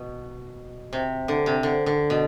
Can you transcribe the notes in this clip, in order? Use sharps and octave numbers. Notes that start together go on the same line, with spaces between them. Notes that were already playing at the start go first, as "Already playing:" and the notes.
Already playing: B2
C3
D3
C3
D3
D3
B2